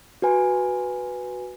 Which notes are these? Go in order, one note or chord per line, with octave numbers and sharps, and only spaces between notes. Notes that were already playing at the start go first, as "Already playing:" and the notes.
F#4 B4 G#5